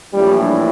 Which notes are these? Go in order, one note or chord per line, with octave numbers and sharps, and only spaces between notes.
A#1 A2 E3 G3
D4